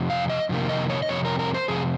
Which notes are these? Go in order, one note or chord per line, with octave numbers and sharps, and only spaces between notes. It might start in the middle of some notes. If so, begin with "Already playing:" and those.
Already playing: F2 C3
F5
D#5
F2 C3 D#3 A#3
D#5
C#5
D#5
F2 C3 C#5
A#4
A#4
C5
F2 C3 G#4